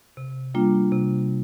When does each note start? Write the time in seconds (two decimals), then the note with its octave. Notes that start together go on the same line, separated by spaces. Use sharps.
0.17 C3
0.54 G3 A#3 D4 F4
0.92 C3